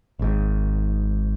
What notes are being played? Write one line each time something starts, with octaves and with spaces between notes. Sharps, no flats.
G#1 G#2 D#3